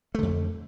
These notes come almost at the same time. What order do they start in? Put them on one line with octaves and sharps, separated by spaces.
A3 D3 F2